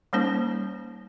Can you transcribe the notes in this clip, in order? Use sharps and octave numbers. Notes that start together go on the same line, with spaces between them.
G3 A#3 C#4 D#4 C5 A5